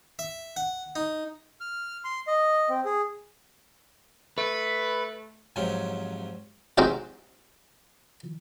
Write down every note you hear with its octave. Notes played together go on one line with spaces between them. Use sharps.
E5
F#5
D#4
F6
C6
D#5
C4
G#4
A3 B4
F2 G#2 C3 F#3 C#4
G#3 C4 D#4 F#4 G4